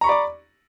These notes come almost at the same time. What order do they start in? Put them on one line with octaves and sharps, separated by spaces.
A#5 C#6 B5 D5 D6